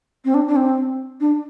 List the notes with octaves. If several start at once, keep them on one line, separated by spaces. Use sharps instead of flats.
C4
D4
D4
C4
D4